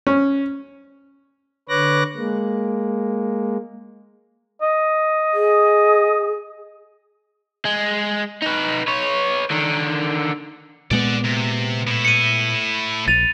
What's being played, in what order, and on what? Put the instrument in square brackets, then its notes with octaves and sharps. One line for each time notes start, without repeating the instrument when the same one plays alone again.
[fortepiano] C#4
[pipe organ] D3 B4 C#5 D6 F#6 A#6
G#3 A#3
[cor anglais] D#5
[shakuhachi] G#4
[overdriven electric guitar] G#3
D#4 B4
B4 C#5
D3 D#3
[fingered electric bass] A#2 G#3 B3 [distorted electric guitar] D5 F#5
[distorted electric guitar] C3
A2 E4
[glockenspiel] C#7 D#7
[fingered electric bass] A#1 [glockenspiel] A6 D#7 F7